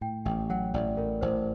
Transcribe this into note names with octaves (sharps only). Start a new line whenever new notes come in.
A2 G5
A1 G5
F#3 F#5
A1 D5
A2 A#4
A1 C5